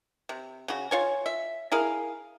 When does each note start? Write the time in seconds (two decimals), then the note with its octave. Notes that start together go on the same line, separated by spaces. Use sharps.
0.29 C3
0.68 C#3 F#4
0.91 F4 C#5 G#5
1.26 E5
1.72 E4 G#4 A#4 F5